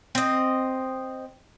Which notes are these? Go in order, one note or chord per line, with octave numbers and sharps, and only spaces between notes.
C4 D#5